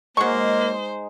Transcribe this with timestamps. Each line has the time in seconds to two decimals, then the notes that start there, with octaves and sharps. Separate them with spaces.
0.17 F#3 G#3 A#3 D#4 C5 C#6